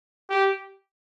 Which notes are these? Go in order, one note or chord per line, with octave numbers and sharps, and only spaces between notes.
G4